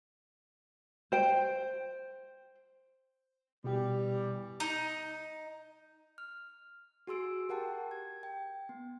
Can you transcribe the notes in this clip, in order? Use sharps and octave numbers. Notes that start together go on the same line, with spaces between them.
C5 G5
B2 E3 G3 G4
D#4
F6
F#4 G#4 C6 E6 D7
G4 A#4 F#5 G5 A5
G#6
G5
B3